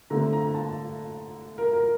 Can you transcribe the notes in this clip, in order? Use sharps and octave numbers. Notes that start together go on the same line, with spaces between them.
D3 A3 C4 A#5
A#5
A5
A#4
A#4